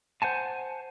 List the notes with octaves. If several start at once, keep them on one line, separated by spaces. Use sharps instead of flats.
C5 F#5 G#5 A5